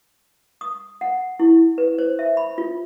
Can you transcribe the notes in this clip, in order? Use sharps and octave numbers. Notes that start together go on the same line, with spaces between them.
D#6
F#5
E4
B4
C5
E5
B5
F4